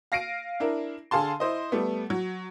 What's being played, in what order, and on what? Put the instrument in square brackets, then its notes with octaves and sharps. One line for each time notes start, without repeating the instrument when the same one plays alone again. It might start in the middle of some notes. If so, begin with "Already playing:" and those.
[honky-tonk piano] F5 A#6 C7 D7 D#7
D4 E4 A#4
D3 G#4 F5 A5 C6
E4 C5 D#5
G3 A3 B3
F#3